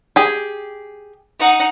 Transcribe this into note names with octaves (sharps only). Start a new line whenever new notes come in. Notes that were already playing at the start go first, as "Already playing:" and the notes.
G4 G#4
D#4 F#5